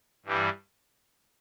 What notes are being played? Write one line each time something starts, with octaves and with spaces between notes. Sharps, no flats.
G2 E3 G3